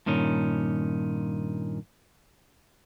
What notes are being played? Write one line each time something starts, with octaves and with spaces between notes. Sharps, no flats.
G2 A#2 D#3 C#4